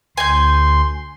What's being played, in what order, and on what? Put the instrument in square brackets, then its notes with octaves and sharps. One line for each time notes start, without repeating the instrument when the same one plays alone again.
[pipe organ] D2 C6 [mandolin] G#5 G6